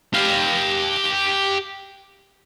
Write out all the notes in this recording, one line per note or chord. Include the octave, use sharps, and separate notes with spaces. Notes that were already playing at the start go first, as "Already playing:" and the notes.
G4 F5